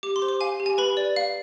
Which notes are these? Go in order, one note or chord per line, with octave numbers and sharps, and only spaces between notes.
G4 D6
C6
C5
D6
F5 G#5
G4
G#5
B4 B5
D5
F5